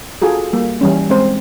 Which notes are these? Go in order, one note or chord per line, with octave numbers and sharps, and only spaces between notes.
F4 F#4 G#4 A4
G3 A#3
E3 G3 C#4
G#3 C4 C5